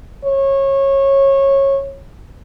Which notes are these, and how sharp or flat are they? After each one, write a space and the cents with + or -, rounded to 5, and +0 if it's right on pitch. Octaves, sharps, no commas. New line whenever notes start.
C#5 -20